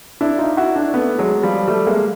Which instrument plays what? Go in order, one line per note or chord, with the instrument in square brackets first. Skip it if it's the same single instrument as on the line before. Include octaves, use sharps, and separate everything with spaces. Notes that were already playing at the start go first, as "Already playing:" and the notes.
[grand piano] D4 E4
D#4 F4
E4 F#4
D4 E4
A3 B3
F#3 G#3
F3 G3
G3 A3
G#3 A#3